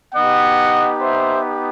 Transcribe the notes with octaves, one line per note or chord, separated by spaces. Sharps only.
B3 D#4 G4 D#5 F#5
C5 E5